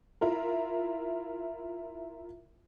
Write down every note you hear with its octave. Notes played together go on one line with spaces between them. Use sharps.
E4 F4 A#4